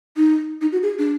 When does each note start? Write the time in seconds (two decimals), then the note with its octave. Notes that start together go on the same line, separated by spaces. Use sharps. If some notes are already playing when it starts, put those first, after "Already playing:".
0.17 D#4
0.61 D#4
0.72 F#4
0.83 G#4
0.98 D4